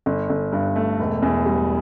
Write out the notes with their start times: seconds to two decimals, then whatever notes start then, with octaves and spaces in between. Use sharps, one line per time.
0.06 G1
0.29 G1
0.52 G2
0.76 A3
0.99 E1
1.22 E2
1.46 G3